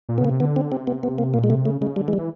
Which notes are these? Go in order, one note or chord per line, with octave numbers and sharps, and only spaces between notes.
A#2
B3
C#3
A#3
C3
D3 B3
C4
C3 C4
B3
B3
A#3
A#2 A#3
G#3
C3 A3
C#3 A3
C#3 G#3
D3 G3
E3 G#3
G3
E3